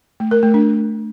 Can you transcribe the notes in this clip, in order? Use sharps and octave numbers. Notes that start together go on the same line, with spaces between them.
A3
A#4
A3
D4